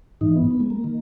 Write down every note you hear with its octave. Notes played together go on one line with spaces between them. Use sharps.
G#2 E3 D#4
B3
B3
G#3
A#3
D#3